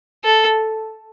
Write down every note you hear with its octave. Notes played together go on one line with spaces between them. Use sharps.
A4